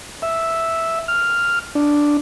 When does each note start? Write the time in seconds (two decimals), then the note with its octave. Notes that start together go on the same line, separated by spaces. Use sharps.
0.22 E5
1.08 F6
1.75 D4